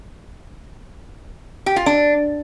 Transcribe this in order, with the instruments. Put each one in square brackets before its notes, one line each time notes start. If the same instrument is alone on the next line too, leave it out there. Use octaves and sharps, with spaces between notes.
[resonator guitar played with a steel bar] G4
F4
D4